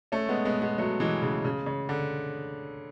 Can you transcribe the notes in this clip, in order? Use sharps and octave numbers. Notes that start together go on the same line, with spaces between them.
A3 C#4
G#3 B3
G#3 B3
G#3 B3
F#3 A3
E3 G#3
C#3
C#3
C#3
D3